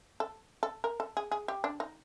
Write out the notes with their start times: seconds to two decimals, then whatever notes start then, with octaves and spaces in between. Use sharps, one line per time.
0.20 A4
0.63 A4
0.84 A#4
1.00 A4
1.17 G#4
1.32 G#4
1.48 G4
1.64 D4
1.80 D#4